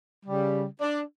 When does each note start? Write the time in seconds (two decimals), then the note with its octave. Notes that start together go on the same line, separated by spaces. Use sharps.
0.25 C#3 G3
0.81 D4